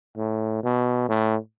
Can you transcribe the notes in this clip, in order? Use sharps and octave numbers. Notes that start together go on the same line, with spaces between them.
A2
B2
A2